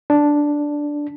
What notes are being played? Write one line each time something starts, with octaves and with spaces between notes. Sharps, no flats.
D4